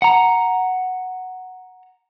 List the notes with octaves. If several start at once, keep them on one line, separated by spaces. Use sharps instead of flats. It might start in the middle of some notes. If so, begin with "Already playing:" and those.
F#5 A#5